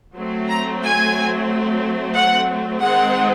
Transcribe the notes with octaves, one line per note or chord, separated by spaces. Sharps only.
F#3 A3 C4
A#5
G#5
F#5
D#3 G#3 C4 F#5